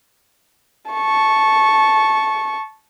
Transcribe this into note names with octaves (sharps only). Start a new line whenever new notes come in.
A5 C#6